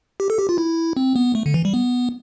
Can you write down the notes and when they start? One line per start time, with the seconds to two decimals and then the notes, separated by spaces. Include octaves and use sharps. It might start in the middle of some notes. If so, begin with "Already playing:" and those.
0.20 G4
0.30 A4
0.38 G4
0.49 F4
0.58 E4
0.97 C4
1.16 B3
1.35 A3
1.46 D3
1.54 E3
1.65 G3
1.74 B3